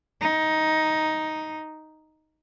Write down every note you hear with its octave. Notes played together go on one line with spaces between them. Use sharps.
D#4